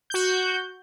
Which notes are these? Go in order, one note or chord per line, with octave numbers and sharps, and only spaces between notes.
F#4 G6